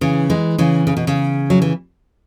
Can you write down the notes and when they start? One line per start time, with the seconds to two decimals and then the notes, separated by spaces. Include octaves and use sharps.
0.01 C#3 E3
0.30 E3 G#3
0.58 C#3 E3
0.87 C#3
0.97 B2
1.07 C#3
1.50 F#3
1.62 E3